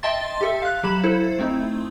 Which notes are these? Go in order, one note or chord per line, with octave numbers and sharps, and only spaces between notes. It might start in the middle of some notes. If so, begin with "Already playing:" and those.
D#5 E5 G5 A5 C6 A6
G4 A4 E5
F5 F#6
F#3 G4 B5 E7 F#7
E4 A4 C5
A3 C4 D#4 E4